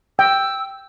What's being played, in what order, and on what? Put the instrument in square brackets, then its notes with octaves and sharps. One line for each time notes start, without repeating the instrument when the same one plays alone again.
[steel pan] G5 [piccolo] E6